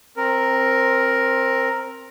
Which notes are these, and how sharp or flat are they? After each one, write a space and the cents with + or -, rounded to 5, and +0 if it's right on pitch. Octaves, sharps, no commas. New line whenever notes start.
C4 +15 A#4 +0